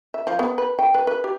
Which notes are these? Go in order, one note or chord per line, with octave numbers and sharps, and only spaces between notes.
E5
F3
B3
B4
G5
B4
B4
G4